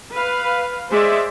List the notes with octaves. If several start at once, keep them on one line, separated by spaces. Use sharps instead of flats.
B4 F5
G#3 C5 D5 E5